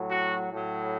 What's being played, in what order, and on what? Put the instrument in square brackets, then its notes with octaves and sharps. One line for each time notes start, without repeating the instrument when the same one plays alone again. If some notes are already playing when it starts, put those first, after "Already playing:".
Already playing: [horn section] A2 F#3
F#4
A2 F#3